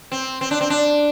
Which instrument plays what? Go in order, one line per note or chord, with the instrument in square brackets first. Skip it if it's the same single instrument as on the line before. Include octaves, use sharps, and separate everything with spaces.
[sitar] C4
C4
D4
C4
D4